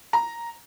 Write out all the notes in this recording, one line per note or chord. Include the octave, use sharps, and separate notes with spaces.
A#5